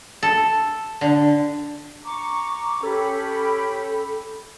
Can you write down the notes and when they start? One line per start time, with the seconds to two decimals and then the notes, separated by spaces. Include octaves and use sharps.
0.23 A4
1.01 D3
2.04 A#5 C#6 D6
2.83 C#4 G4 A4 B5